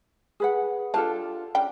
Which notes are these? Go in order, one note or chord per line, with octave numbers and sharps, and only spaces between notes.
G#4 B4 F#5
D4 F4 G4 A4 F5 A5
C#3 G3 D4 G5